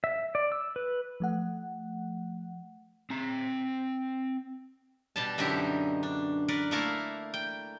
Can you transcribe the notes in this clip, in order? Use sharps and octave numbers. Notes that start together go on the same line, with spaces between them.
E5
D5
E6
B4
F3 A3 F#5
C4 A#5
B2 G3 A5
F#2 D3 D#4 E4 G4 E5
D4
A#4 B4 D5 F#5
A3 A#3 E4 A4 A#4 F5
G5